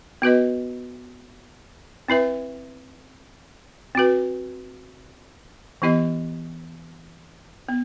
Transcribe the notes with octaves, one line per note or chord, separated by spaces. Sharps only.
B3 F#4 B4 D#5
C4 E4 B4 E5
C4 F#4 B4
E3 B3 E4 G4 D#5
B3